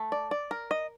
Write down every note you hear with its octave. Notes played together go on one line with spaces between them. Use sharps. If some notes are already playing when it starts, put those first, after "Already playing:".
Already playing: A3
D5
D5
A#4
D#5